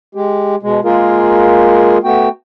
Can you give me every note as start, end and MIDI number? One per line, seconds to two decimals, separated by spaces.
0.15 0.55 56
0.15 0.55 67
0.63 0.80 47
0.63 0.80 56
0.85 1.98 56
0.85 1.98 58
0.85 1.98 65
0.85 1.98 68
0.85 1.98 70
2.04 2.29 57
2.04 2.29 59
2.04 2.29 66
2.04 2.29 79